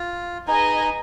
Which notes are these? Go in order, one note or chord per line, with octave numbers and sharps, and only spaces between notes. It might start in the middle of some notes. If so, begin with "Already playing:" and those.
Already playing: F4
D#4 G#4 B4 D#5 G#5